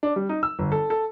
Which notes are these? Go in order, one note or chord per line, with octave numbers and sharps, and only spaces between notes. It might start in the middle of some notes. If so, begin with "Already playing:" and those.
D4
G3
D#4
E6
G1
A4
A4